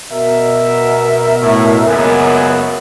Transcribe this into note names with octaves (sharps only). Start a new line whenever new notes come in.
B2 A#4 E5
A2
C#2 F#2 A#3 B3 E5 G#5